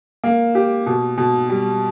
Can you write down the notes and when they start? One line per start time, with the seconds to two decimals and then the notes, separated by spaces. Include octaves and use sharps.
0.24 A#3
0.55 G4
0.86 B2
1.18 B2
1.49 G3